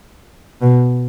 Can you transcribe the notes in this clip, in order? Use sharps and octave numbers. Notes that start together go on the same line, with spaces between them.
B2